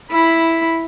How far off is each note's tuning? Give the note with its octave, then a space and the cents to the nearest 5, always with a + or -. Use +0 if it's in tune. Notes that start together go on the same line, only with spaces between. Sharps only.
E4 +0 B5 +0